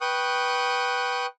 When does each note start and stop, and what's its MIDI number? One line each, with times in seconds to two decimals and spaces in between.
0.01 1.26 71
0.01 1.26 79
0.01 1.26 85
0.01 1.26 87
0.01 1.26 90